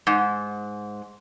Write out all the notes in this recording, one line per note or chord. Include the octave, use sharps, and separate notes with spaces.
G#2